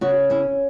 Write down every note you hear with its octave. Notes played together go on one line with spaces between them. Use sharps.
C#3 F#4
C#4 E4